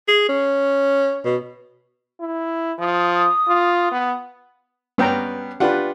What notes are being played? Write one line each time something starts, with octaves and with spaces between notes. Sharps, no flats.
G#4
C#4
B2
E4
F3 D#6
F4
B3
G2 B3 C#4 G5 A#5
D4 F4 G4 B4 F#5